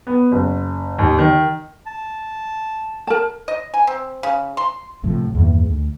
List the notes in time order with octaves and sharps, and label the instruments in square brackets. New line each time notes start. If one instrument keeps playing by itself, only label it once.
[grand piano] B3
F#1
D#2
D#3
[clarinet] A5
[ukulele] A#4 A5
[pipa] D#5
G#5
C4
C#3
C6
[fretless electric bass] A#1 A2 C3 F3
E2 G2 D#3 A#3
D2